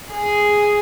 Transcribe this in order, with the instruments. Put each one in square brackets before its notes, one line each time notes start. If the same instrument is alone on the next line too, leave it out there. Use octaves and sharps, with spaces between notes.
[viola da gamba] G#4